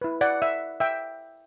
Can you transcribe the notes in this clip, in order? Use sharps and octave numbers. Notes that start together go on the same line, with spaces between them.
E4 B4
D5 F#5
E5
E5 G5